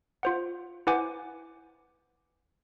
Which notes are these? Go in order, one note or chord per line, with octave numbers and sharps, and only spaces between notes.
F4 C5 F#5
E4 B4 C5 F#5 G#5 D6